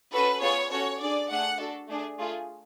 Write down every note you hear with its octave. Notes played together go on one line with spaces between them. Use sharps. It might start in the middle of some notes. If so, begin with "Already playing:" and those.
C#4 F#4 A4 B4
B3 F4 G#4 C#5
C#4 F#4 A4 C#5
D4 G#4 D5
A3 D4 G#4 F#5
D4 F#4 A4
A3 D4 G#4
A3 F4 G#4